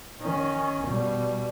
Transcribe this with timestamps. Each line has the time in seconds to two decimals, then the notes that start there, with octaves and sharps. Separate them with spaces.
0.21 D#3 C#4
0.86 B2 G3